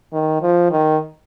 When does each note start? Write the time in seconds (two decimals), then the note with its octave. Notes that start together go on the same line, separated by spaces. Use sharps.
0.13 D#3
0.42 F3
0.71 D#3